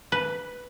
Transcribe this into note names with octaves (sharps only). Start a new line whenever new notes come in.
B4